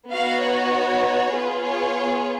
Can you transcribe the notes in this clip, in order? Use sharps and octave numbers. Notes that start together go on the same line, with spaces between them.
B3 D#4 F#4 F5
C#5
B3 F4 G#4 B4
C#5